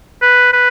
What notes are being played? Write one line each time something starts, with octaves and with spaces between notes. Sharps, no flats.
B4
B4